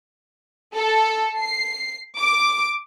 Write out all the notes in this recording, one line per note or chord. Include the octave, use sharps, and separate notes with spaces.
A4
C7
D6